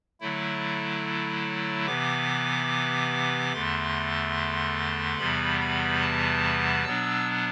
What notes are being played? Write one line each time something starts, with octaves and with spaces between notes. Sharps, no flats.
D3 F#3 A3 E4
C3 E3 B3 D6
E2 D3 A3 C6
E2 C3 E3 G3 B3 B5
B5
A5
B2 F#3 B3 D4 E6